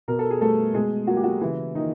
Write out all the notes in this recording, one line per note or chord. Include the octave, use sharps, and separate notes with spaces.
B2 A#4
A4
G#4
G3 A3 B3 A4
B2 G#3 G#4
F#3 A#3 F#4
G4
F#3 F#4
C#3 E3 E4
D#3 F3 A#3 D#4